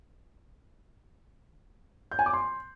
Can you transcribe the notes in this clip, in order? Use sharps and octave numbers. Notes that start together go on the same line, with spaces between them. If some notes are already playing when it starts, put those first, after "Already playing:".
G6
G#5
D6
C6